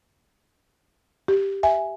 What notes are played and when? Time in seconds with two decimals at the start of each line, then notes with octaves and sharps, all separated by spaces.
1.28 G4
1.63 E5 G#5